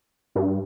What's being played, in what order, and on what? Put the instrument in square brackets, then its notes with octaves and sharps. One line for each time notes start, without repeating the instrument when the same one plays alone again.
[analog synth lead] G2